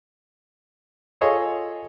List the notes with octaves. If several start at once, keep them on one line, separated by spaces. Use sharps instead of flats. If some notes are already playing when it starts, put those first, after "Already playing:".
F4 G#4 A4 C#5 D#5